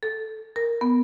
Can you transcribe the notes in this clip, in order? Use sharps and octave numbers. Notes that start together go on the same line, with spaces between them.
A4
A#4
B3